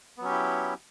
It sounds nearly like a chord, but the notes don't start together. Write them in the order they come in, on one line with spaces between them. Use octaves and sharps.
B3 F#3 C#4 G4 E4